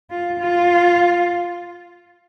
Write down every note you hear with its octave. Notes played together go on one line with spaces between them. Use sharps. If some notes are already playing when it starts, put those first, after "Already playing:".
F4
F4